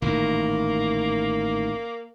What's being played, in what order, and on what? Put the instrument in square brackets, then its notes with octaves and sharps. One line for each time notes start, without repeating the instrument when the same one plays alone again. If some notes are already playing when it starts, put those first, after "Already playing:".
[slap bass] A1 A#2 D#3 [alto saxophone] A#3